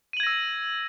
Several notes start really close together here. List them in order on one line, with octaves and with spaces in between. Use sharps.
D#7 F#7 G#6 A#6 E6